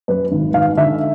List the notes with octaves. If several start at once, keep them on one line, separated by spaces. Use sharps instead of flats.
F#2 B4
G#1
G#1 F5
D3 E5